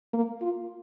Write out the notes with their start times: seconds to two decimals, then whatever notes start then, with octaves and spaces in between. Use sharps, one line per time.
0.13 A#3
0.42 F4